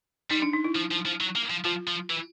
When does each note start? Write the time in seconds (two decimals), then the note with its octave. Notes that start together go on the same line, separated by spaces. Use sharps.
0.30 G3 D#4
0.42 D4
0.53 D#4
0.64 E4
0.75 F3
0.91 F3
1.06 F3
1.21 F#3
1.36 A#3
1.50 F3
1.65 F3 F4
1.87 F3
2.10 E3